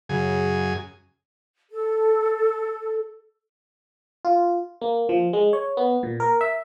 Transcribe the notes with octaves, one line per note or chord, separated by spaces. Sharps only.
F#2 C#3 G#4
A4
F4
A#3
F3
G#3
C#5
B3
A#2
A#4
E5